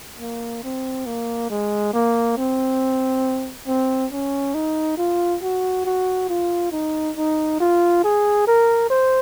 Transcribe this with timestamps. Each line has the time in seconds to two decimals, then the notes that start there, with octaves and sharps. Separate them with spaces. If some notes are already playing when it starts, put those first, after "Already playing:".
0.20 A#3
0.64 C4
1.06 A#3
1.50 G#3
1.93 A#3
2.37 C4
3.67 C4
4.12 C#4
4.54 D#4
4.98 F4
5.42 F#4
5.86 F#4
6.29 F4
6.72 D#4
7.16 D#4
7.60 F4
8.04 G#4
8.47 A#4
8.90 C5